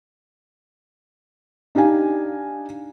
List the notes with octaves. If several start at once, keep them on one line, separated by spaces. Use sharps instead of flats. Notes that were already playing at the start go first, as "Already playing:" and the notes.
D4 D#4 G4 F5 G#5